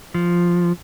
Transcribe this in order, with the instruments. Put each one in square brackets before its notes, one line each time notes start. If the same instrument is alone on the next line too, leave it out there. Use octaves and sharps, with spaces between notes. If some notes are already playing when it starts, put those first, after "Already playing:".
[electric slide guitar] F3